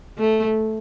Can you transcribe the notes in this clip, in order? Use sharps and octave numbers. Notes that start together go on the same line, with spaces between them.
A3